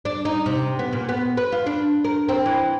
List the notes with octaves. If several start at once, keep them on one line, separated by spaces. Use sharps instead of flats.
D4
D#4
C3
B3
A#2
B3
B4
F4
D4
A#4
C4
E3